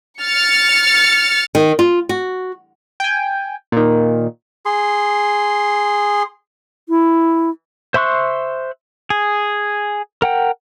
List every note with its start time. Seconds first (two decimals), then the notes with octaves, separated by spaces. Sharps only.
0.20 F6 A6 C#7
1.55 D#3
1.79 F4
2.09 F#4
3.00 G5 G#5
3.72 A#2 D#3
4.66 G#4 C6
6.89 E4
7.94 C5 E5 C6 C#6 F#6
9.10 G#4
10.22 A#4 F#5 G5